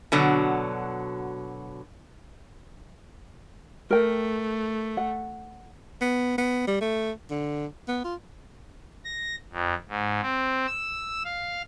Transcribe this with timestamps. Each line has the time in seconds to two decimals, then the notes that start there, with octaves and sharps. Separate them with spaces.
0.12 B2 D3 F#3
3.91 A3 A#4 G5
4.97 F#5
6.01 B3
6.38 B3
6.67 G3
6.81 A3
7.31 D3
7.88 B3
8.04 F4
9.05 A#6
9.51 F2
9.89 G#2
10.22 C4
10.67 E6
11.25 F5